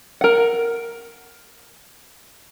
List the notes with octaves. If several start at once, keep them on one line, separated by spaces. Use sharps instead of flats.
A#4 F#5